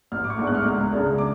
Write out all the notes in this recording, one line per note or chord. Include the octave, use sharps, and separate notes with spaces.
A1 F6
D6
C#6
G#2 G#3 B3 D4
F#6
F6
D6
C#2 F6
C#3 G#3 D4
D6